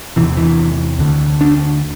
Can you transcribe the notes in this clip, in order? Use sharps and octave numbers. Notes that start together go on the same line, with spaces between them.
E2 C3 E3
E3
D2 D3
D4